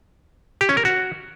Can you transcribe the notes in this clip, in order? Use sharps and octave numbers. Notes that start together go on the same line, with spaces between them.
G4
C#4
A#4
F#4